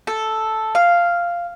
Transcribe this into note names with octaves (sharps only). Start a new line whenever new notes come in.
A4
F5